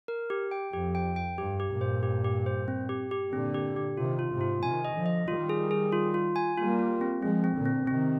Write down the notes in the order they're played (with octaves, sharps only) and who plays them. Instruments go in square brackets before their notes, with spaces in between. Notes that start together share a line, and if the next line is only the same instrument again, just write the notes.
[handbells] A#4
G4
G5
[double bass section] F2 [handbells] G4
[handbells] G5
G5
[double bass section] G2 [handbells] G4
[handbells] G4
[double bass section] G2 A#2
[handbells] C5
G4
G4
C5
C4
G4
G4
[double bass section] A#2 D3 [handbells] C4
[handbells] G4
G4
[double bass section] C3 D#3 [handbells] F4
[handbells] F4
[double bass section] G#2 C3
[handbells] F4
[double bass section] C3 D#3 [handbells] G#5
[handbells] D#5
[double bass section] D3 F3
[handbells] D#5
[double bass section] D#3 G3 [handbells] F4
[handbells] G#4
G#4
F4
F4
G#5
[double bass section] G3 A#3 [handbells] F4
[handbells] F4
C4
[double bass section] F3 G#3 [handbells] C4
[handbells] C4
[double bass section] A#2 D3
[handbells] C4
[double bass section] C3 D#3 [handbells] C4